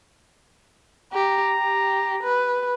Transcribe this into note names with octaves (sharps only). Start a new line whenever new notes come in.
G4 A#5
G4
B4